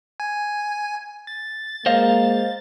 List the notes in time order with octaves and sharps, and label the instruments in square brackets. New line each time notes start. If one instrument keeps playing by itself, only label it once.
[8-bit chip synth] G#5
A6
[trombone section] G#3 A#3 [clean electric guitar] C5 D#5 F5